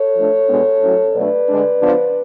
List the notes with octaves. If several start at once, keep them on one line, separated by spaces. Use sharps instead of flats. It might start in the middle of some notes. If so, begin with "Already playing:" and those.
Already playing: A4 C#5
F3 A3 D4
B2 G#3 B3 D4
A2 F#3 C#4
B2 F#3 A3 D4 B4 D5
D3 G#3 D4
C#3 F3 B3 D4